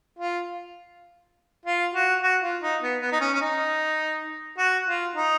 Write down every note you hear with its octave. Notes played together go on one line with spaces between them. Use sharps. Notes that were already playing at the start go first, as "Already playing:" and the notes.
F4
F4
F#4
F#4
F4
D#4
B3
B3
D#4
C#4
C#4
D#4
F#4
F4
D#4